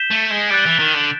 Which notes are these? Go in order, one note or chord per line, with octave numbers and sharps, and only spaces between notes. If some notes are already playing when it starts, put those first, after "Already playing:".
Already playing: G6 B6 E7 G7
A3
G#3
G3 F#6 A6 D7
E3
D#3
D3